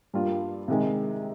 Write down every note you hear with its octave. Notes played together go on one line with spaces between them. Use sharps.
G2 G3 A#3 F4
C3 D#3 G#3